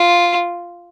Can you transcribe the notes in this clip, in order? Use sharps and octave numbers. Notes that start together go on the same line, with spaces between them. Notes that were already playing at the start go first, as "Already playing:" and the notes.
Already playing: F4